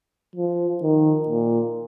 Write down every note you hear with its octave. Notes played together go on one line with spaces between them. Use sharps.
F3
D#3
A#2